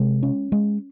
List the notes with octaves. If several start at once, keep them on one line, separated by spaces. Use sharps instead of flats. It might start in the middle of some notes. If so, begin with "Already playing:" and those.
Already playing: C3 G#3
C#4
G#3